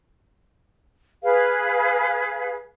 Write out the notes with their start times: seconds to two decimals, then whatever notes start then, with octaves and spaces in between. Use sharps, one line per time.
1.23 G#4 B4 F5